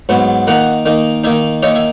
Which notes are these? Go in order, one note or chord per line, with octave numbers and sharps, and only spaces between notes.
G#2 F#3 B3
D#3 A#3 D#4 F#5 A#5
D#3 A#3 D#4
D#3 A#3 D#4 E5 G#5
D#3 A#3 D#4 C#5 E5
E5 G#5